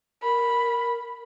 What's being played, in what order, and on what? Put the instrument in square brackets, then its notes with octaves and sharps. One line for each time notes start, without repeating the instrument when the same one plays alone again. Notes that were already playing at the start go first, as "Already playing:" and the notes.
[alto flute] A#4 [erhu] B5